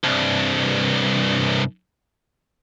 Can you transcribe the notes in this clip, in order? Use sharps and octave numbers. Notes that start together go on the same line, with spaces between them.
C2 G2